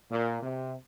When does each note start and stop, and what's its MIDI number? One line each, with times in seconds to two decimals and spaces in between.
0.10 0.41 46
0.42 0.73 48